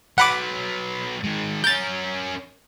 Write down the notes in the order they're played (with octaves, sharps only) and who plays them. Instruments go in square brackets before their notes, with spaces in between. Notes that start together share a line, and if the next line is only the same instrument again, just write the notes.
[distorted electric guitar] F#3 B3 [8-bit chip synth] F#5 B5 D6
[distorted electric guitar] D#3 G#3
[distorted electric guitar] C#4 A#4 [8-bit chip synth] G6 A6